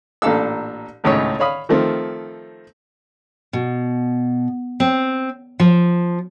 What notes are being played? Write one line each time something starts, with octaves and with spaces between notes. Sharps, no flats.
A1 A#2 D4 A4 F5 E6
G#1 C#2 A2 C#5
C#5 F5 B5 D#6
D#3 F3 A3 C4
B2
C4
F3